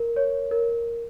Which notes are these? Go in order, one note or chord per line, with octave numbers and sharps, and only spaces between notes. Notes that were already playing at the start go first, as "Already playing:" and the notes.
Already playing: A#4
C#5
A#4